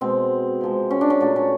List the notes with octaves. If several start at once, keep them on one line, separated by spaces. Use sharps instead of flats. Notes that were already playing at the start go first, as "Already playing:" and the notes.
B2 G#3 C4
C3 F3 G#3
C#4
D4
C#4
A#2 F#3 A3 D4
C#4